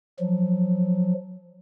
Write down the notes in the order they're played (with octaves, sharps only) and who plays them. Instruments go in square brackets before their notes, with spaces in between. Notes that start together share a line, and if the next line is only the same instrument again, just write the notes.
[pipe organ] F3 F#3